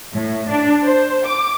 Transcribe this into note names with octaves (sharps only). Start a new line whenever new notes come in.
A2
D4
C5
D6